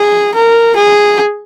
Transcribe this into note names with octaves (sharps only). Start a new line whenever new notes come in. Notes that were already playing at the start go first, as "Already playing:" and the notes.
Already playing: G#4
A#4
G#4